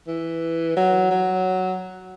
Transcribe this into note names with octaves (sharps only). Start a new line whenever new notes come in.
E3
F#3
F#3